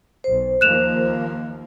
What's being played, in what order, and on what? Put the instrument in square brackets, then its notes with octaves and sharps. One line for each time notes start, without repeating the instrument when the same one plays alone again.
[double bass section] B1 [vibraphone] C5
[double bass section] D#2 F3 A#3 [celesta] F#6 E7 F7